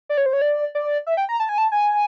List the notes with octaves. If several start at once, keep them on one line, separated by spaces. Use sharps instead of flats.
D5
C#5
C5
C#5
D5
D5
E5
G5
A#5
A5
G#5
A5
G#5